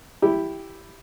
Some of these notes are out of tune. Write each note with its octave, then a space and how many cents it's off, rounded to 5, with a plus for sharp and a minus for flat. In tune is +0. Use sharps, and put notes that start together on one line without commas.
E4 +0 G4 +0 B5 +0